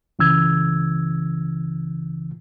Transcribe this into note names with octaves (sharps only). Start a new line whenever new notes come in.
C#2 C#3 E3 E6 G#6